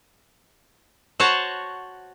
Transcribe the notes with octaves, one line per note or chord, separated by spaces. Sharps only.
F#4 C5 C#5 F#5 A5